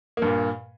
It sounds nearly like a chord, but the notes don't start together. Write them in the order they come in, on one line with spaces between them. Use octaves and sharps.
A#3 G2 A#2